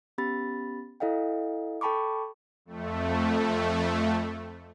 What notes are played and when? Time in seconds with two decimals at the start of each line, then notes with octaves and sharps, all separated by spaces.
0.18 B3 C#4 G4 B5 A6
1.00 E4 A4 D#5 F5 G5
1.81 A4 G5 A5 B5 C#6 D6
2.65 F2 A3